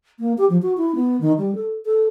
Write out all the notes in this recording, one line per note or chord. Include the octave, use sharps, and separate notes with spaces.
A#3
G4
F3
F#4
E4
B3
D#3
G3
A4
A4